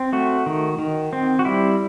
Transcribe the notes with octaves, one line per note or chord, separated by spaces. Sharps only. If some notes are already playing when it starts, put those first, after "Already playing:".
Already playing: C4
A3 F#4
D#3
D#3
C4
F#4
G3 E4